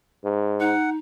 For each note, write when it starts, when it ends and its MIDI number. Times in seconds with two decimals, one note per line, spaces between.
0.24 0.73 44
0.60 0.97 63
0.60 0.90 78